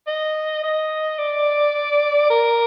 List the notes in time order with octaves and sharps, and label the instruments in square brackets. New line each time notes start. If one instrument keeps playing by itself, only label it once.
[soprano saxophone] D#5
D#5
D5
A#4